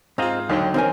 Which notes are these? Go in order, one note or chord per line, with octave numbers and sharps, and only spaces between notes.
G#2 C4 F4 G#4 D#5 F5 A#5
D#2 D3 D#3 F#3 G5
B1 E2 C4 C#4 A#4 G#5